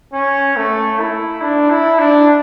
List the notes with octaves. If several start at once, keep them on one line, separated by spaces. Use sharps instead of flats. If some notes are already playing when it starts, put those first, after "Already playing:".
C#4
A3
E4
D4
E4
D4